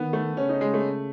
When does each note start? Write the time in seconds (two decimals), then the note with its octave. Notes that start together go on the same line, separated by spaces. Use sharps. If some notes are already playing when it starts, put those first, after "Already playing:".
Already playing: D#3 B3
0.13 A3
0.37 C#3 C#4
0.49 D#4
0.61 G#3
0.74 A3